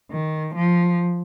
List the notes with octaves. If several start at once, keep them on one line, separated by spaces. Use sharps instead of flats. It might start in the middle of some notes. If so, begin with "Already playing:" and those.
D#3
F3